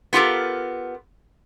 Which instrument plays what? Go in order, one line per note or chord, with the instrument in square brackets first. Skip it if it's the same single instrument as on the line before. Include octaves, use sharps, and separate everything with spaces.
[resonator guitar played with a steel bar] B3 F4 G4 A4 A#4